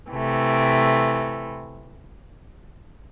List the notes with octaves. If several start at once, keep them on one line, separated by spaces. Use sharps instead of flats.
C3 E3 A3